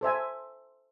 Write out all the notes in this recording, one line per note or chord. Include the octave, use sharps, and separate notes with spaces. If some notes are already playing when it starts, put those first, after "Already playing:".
A4 C5 E5 G#5